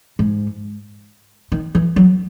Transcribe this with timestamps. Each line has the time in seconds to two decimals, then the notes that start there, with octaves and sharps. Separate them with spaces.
0.19 G#2
1.52 D#3
1.75 E3
1.96 F#3